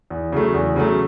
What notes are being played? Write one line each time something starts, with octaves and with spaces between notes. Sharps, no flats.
E2
C#3 F#3 A3
E2
C#3 F#3 A3